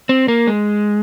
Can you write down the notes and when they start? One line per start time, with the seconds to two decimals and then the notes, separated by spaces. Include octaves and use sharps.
0.09 C4
0.28 A#3
0.47 G#3